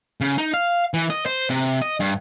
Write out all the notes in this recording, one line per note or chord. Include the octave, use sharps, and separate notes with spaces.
C#3
D#4
F5
E3
D#5
C5
C3
D#5
G2